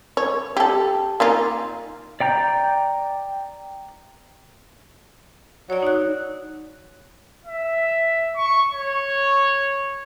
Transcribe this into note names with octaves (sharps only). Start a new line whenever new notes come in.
C#5
G4 A4
A#3 D#4 F4
D5 G5 A#5 G6
F#3 C#5 D5
D#4 F#6
E5
C#6
C#5